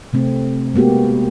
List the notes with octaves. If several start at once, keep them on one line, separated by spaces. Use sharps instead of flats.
C3 A3 C4
G#3 A#3 B3 F#4 G4